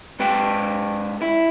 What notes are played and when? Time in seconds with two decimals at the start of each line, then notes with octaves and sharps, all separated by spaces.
0.19 G#2 B4 G5
1.22 E4